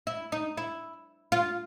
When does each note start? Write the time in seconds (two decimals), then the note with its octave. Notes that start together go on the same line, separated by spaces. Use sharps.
0.07 E4
0.32 D#4
0.57 E4
1.32 F4